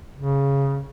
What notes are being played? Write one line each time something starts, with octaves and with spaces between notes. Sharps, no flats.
C#3